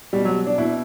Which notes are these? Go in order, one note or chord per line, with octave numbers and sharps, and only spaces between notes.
B2 G3
F#3
D4
B2 E4